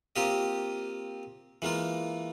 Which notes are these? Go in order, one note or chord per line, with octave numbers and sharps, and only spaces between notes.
A#3 C4 F4 G4 D#5
E3 G#3 A#3 F4